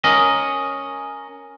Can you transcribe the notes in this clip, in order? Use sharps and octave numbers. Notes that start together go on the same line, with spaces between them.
C#4 A#4 D#5